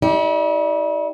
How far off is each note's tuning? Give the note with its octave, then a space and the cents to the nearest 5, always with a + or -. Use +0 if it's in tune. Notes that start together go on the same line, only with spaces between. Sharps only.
E4 -45 G4 +0 D5 +5